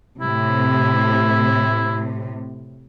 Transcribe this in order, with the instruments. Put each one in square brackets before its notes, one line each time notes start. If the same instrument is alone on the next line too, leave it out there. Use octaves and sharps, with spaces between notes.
[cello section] A2 C3 [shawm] E4